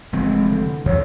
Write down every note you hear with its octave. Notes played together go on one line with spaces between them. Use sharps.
F1 E3 G#3 C4
D3
E2 C#5